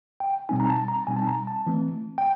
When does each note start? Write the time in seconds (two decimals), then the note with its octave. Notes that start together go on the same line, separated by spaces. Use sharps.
0.20 G5
0.49 B2 G3 C4 D#4 G#5
0.60 A#5
0.69 A5
0.88 A#5
1.07 B2 G3 C4 D#4 G#5
1.16 A5
1.27 A#5
1.47 A5
1.67 E3 A3 C4
2.18 G5